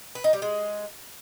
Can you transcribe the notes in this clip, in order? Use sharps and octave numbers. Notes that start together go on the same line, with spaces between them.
B4
D#4
G3
G#3